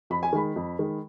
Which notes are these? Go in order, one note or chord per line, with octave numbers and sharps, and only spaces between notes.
F2 B5
G#5
D#3 G#3 B5
F2
D#3 G#3